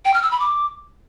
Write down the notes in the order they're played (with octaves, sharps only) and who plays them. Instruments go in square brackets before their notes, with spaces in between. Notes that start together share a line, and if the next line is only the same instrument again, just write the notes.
[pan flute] G5
F6
E6
B5
D6